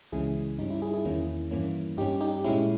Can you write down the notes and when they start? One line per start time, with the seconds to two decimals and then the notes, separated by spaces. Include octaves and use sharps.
0.12 C#2 C#3 E3 G#3 C#4 E4 G#4
0.59 G2 G3 C#4 D#4
0.70 E4
0.82 E4 G#4
0.93 E4 G#4
1.05 E2 D#3 A#3 C#4 E4
1.51 G2 E3 A#3 C#4
1.97 G2 G3 C#4 D#4 G4
2.21 D#4 G4
2.44 A#2 G#3 C#4 E4